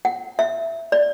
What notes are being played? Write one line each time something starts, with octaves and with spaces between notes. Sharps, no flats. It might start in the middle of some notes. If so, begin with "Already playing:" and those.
F#5
E5
D5